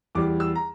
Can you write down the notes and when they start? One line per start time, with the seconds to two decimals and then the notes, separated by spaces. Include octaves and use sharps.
0.15 E2 E3 G3 D6
0.40 E6
0.55 A#5